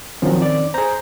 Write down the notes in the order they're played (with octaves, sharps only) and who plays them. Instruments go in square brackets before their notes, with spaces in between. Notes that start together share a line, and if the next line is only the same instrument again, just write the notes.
[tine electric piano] D#3 C4 C#4 [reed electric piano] F3 F#3
[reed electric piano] D5
[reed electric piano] G#4 A#5 [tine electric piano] C5 G6